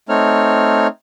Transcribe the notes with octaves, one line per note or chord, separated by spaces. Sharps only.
A3 C4 D#4 C#5 F6